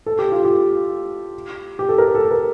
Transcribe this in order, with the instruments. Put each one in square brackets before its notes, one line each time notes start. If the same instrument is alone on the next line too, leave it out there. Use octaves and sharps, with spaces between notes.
[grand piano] A4
G4
F4
G4
G4
A4
A#4
A4
A#4